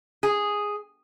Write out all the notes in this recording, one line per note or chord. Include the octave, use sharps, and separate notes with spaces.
G#4